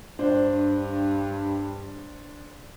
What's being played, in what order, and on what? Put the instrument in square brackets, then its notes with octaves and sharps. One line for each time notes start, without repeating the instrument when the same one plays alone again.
[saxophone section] G2 [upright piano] D4 C5